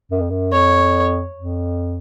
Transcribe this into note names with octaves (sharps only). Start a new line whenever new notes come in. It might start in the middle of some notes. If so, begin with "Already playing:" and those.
F#2
F2
F#2
F2 C#5
F2